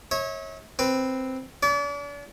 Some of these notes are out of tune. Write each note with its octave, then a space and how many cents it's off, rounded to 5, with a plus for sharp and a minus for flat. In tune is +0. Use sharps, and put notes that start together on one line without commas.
C#5 -20 E5 -45
C4 +0 B4 +0
D4 -40 D5 -40